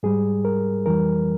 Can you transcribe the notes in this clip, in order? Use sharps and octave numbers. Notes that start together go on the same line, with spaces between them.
G#2 G3 G#4
A#4
F2 E3 G3 A#4